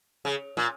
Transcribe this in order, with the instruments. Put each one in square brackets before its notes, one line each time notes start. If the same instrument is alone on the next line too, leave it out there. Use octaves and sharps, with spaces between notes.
[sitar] C#3
A#2